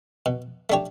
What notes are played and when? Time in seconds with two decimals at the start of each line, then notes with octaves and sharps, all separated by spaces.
0.26 B2
0.70 A3 D4 G4 C#5